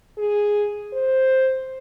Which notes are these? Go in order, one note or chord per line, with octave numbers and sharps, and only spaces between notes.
G#4
C5